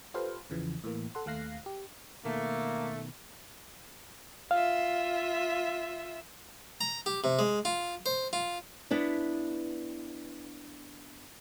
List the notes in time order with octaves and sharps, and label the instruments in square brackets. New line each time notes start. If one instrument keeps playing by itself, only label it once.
[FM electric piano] F4 G4 A4 B4 C5 F5
E2 C#3 E3 F3
A2 E3 A#3
A4 F#5 C6
D#2 A3 F5 F#6 A#6 C7
G4
[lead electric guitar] B2 D#3 [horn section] A3 [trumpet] A#3
[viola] F4 E5 [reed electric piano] F5
[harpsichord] A#5
G4
C3
G#3
F4
C5
F4
[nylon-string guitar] B3 D4 E4